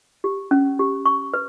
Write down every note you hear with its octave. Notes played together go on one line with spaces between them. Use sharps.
G4
C#4
G4
C#6
B4